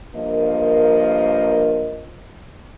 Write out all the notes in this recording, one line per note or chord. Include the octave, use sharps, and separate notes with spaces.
G2 F3 A#3 A#4 D#5